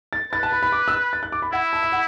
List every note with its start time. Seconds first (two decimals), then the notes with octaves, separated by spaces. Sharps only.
0.13 A6
0.33 B4 A6
0.43 A5
0.52 B5
0.63 B5
0.72 D6
0.88 E6
0.92 F#6
1.13 A6
1.23 F#6
1.32 D6
1.42 B5
1.53 E4 F#5
1.73 A5
1.82 E5
1.92 F#5